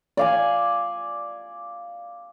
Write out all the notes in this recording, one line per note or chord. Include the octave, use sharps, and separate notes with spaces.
D5 F5 G#5